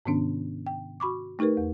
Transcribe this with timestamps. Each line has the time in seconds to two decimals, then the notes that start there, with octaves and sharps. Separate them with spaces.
0.05 G#2 C3 D#3 B3 C#4 D4
0.67 G5
1.00 F#4 B5 C#6 D6
1.39 A3 D#4 G4 A#4 B4
1.57 E2